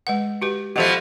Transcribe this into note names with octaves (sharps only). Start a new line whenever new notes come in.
G#3 B4 F#5
F#4 G4 B4
B2 F3 G4 A4 E5